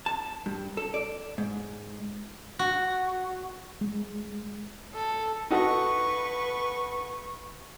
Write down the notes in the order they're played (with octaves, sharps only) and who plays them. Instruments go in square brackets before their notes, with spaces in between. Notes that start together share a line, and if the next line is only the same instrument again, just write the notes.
[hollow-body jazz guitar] A5
G2
A4
D5
G#2
[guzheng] F#4
[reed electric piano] G#3
[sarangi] A4
[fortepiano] D#4 F#4 A4 [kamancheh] B4 C#6